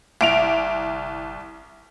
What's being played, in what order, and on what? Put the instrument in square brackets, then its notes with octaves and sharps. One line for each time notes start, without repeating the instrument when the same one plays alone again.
[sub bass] G1 [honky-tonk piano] C2 D7 F7